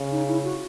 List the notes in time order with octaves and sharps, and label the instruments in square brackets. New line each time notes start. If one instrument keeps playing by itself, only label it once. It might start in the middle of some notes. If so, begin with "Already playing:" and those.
Already playing: [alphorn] C#3
[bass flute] D#4
E4
F#4